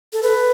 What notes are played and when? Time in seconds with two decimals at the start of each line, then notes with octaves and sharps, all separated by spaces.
0.13 A4
0.23 B4